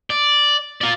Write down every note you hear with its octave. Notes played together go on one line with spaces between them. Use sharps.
D5
F4 D5